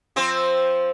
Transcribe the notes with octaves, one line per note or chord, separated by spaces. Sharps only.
F3 C4 C5